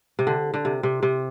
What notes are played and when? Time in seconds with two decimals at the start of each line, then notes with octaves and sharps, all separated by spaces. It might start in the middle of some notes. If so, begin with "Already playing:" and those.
0.19 C3
0.27 D3
0.54 D3
0.65 C3
0.83 C3
1.03 C3